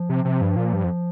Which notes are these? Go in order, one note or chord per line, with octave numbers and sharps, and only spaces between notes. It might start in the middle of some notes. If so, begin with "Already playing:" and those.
Already playing: F3
C3
C3
G2
A#2
G2
F2